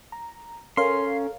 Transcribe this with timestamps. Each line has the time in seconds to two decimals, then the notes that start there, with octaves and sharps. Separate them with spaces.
0.12 A#5
0.77 C#4 A4 A#4 C#5 F5 C6